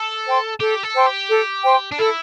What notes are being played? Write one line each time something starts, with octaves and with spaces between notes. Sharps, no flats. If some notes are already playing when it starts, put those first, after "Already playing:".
Already playing: A4
C5 G5 C6
G4 A4
A4
C5 G5 C6
G4
A4
C5 G5 C6
D4
E4 A4